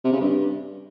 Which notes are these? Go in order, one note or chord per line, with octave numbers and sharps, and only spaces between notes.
C3
C#3
G2